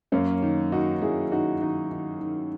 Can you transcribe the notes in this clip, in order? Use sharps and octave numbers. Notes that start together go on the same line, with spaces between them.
F#2 A#3 C#4
D#3
D#3 D#4 F#4
F#2 E4 G#4
D#3 D#4 F#4
D#3 D#4 F#4
D#3
D#3